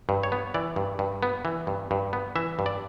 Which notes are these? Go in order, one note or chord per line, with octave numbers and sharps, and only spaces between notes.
G2
C#5
B3
E3 D5
G2
G2
B3
E3
G2
G2
B3
E3 E5
G2
D5